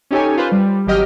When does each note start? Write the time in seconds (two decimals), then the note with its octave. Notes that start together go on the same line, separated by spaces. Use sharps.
0.11 C#4 D#4 G4 A4 C#5 G#5
0.37 F4 B4 C5
0.52 G3
0.87 G#1 F#3 G4 D#5 G5 F6